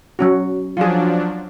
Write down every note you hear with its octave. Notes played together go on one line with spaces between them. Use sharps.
F#3 C#4 F#4
F3 F#3 D4 F4 G#4